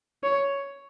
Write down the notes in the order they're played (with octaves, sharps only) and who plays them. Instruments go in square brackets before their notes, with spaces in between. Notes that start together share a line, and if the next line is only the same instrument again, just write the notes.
[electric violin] C#5